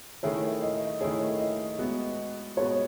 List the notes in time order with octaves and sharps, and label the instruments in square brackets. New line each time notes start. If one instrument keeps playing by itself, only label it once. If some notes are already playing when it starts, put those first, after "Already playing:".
[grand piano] D#3 A3 E4 G#4 [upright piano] C#5 E5
[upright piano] D#5
[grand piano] D#3 A3 E4 G#4 [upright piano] C#5
[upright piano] D#5
[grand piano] G#3 B3 F#4
[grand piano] G#3 B3 F#4 [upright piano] C#5